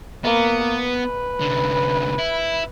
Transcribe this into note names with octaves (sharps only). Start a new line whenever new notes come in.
A#3 B3
B4
C2 D3
E4